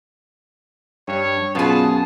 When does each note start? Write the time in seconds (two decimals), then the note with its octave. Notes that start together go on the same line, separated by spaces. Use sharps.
1.08 G2 C#5
1.55 F#2 B2 B3 F4 G#4 B4 A5